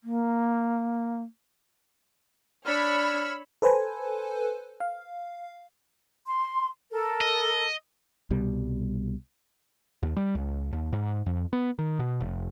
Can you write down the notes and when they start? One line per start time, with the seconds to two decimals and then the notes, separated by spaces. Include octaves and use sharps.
0.04 A#3
2.65 D4 C#5 B5 E6 F6
3.62 A4 B4 C5 G#5
4.80 F5
6.27 C6
6.91 A4 A#4
7.21 D#5
8.30 C2 B2 G3
10.03 D#2
10.17 G3
10.35 C#2
10.73 D#2
10.93 G#2
11.26 F2
11.53 B3
11.79 D#3
11.99 B2
12.20 F1